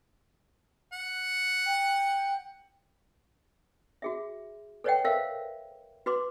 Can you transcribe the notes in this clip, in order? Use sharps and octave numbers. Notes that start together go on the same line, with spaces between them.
F#5
G5
F#4 G#4 E5
A4 B4 C#5 D#5 F#5 G5
A#4 C5 E5 F5
F#4 B4 C6 D6